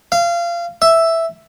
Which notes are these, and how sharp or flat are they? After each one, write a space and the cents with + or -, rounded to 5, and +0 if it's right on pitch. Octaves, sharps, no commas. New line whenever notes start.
F5 -25
E5 +0